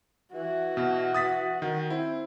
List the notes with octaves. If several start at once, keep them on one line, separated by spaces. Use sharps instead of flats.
E3 F#4
B2
D#6 A6 B6
D#3
C4 E4